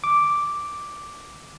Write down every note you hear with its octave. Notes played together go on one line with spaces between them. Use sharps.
D6